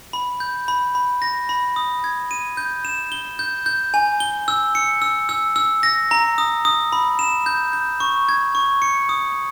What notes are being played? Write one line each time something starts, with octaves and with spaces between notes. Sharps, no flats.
B5
G6
B5
B5
A#6
B5
D#6
G#6
D#7
G6
E7
G7
G6
G6
G#5
G7
E6
C#7
E6
E6
E6
A#6
A#5
D#6
D#6
B5
E7
G6
G6
C#6
G#6
C#6
C#7
D#6